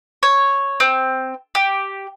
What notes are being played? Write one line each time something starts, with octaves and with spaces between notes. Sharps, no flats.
C#5
C4
G4